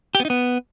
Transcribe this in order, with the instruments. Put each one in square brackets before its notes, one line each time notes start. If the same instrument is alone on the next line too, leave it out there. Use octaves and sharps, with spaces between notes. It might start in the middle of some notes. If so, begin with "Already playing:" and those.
[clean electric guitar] G4
B3
D#4
B3